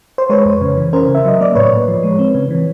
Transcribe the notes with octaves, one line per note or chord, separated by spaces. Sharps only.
C5
G#3 B4 C#5
F2
C#3
E3
C#4 A#4 C5
C#3
E5
F#3 D#5
A#3 D5
A2 B4 C#5
A2
F3
G#3
C4
C#3
E3